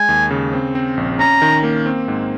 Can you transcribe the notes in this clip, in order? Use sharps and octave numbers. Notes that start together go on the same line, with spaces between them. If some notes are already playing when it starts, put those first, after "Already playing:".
Already playing: G#3 G#5
D#2
C#3
C4
C4
A#1
C#4 A#5
D#3
A#3
C4
G#2